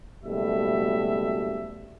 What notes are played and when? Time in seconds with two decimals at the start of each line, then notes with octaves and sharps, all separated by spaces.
0.24 F#1 B2 G3 A3 E5